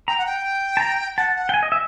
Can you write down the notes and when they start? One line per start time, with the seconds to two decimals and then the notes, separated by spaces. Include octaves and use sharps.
0.08 G5 A#5
0.18 F#5
0.26 G5
0.77 A5
0.80 A#5
1.17 F#5 A5
1.35 F#5
1.49 G5
1.54 G#5
1.63 D#5
1.72 E5